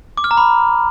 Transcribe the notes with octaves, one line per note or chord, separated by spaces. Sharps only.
D6
F6
A#5
B5